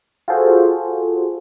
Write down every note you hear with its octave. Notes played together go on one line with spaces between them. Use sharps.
F4 F#4 G#4 A4 C5